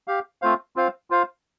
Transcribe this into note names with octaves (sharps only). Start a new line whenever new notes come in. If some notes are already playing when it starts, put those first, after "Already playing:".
G4 F5
A3 C4 F4 C5 F5
C4 F4 C5 F5
F4 C5 F5